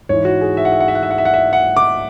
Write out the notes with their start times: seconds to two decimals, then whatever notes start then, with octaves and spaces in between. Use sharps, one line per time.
0.09 G#2 E3 C#5
0.25 F#4
0.41 G#4
0.57 E5
0.65 F#5
0.72 E5
0.80 F#5
0.88 E5
0.95 F#5
1.03 E5
1.11 F#5
1.18 E5
1.25 F#5
1.34 E5
1.53 F#5
1.77 D6